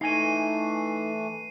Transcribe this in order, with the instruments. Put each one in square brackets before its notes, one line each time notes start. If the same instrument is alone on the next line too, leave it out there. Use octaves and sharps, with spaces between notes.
[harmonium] E3 A3 [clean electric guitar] D#4 G#5 [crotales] C7 D#7